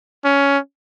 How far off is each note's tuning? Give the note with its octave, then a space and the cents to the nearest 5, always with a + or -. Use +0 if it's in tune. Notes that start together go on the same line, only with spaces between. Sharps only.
C#4 +15